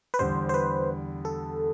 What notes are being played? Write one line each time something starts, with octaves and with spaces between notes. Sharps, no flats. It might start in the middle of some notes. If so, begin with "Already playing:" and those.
B4
E2 D3 G3 C5
C5
B4
A4